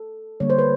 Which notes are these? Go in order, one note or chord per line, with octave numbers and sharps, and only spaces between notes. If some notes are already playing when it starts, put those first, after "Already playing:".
Already playing: A4
D3 G3 A#3 C#5
C5
B4